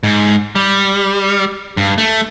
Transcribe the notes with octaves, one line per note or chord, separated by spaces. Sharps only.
G#2
G3
G2
A3